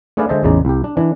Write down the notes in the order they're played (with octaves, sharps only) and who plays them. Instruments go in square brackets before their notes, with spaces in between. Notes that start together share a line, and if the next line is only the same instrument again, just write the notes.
[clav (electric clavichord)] A3 D4 G#4 B4 D5 F5
D3 G#3 C5 D#5 E5 A5
A1 E2 C#3 D#4 D5
C2 G4
D4
E3 D4